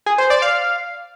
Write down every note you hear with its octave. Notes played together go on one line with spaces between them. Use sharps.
G#4
C5
D5
F5